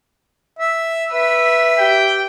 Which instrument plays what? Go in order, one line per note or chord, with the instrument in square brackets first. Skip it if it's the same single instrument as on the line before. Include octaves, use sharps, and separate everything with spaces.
[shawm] E5
[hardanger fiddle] B4 [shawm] E5
[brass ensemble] G4 G5